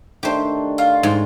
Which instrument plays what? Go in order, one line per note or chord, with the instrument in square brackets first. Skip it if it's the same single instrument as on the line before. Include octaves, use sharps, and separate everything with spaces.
[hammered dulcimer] D#3 A3 D4 [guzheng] G4 C5
[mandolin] F4
[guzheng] G#2